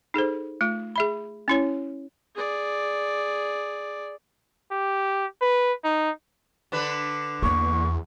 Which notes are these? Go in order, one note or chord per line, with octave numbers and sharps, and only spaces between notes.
D#4 G#4 A4 C5
A3 F4
G#4 E5 B5
C#4 E4 C#5
G#4 D5
G4
B4
D#4
D3 D4 B4
E2 A#3 C#6